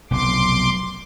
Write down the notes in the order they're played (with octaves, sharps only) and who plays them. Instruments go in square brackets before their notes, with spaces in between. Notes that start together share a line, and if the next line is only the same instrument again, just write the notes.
[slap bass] F1 B1 [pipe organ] C6 D6